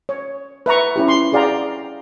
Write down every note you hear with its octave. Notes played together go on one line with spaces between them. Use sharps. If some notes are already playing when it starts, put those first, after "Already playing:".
C#5
B4 E5 A#5 C#6
C#4 E4 G4
C6
F#4 G#4 D5 F5 G5 A#5